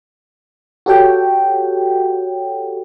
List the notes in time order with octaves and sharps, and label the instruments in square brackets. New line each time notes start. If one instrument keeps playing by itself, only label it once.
[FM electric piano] F#4 G4 A4 C#5 F#5 G5